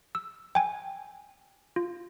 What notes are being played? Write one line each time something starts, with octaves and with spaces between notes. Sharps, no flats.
E6
G5 G#5
F4